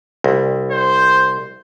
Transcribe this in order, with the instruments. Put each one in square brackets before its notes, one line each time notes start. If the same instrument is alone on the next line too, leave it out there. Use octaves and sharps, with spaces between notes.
[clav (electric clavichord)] C2
[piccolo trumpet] C5